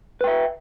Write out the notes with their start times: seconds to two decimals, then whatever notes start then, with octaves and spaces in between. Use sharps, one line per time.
0.21 B4
0.24 G5
0.27 E5